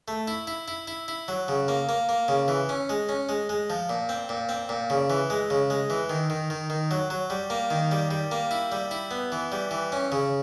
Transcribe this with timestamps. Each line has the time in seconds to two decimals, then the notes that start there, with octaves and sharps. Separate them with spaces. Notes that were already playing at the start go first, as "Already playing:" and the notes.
0.08 A3
0.28 E4
0.47 E4
0.68 E4
0.88 E4
1.08 E4
1.28 F#3
1.48 C#3
1.68 A#3
1.89 A#3
2.09 A#3
2.28 C#3
2.48 E3
2.69 C#4
2.89 G#3
3.09 C#4
3.29 G#3
3.49 G#3
3.70 F3
3.89 A#2
4.09 C4
4.29 A#2
4.49 C4
4.69 A#2
4.90 C#3
5.10 E3
5.30 G#3
5.50 C#3
5.70 G#3
5.90 E3
6.10 D#3
6.30 D#3
6.50 D#3
6.70 D#3
6.91 F#3
7.10 F#3
7.30 G3
7.50 A#3
7.70 D#3
7.91 G3
8.11 G3
8.31 A#3
8.51 E4
8.72 G3
8.91 E4
9.11 B3
9.32 E3
9.52 G3
9.71 E3
9.92 C#4
10.12 C#3